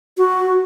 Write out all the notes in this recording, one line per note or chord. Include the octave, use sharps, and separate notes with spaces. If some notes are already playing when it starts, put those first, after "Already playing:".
F#4